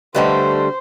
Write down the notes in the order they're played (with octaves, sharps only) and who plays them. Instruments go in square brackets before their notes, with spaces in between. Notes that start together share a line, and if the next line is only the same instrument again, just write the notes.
[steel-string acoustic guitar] D3 G3 A3 [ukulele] B4 D#5 G5 [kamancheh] C5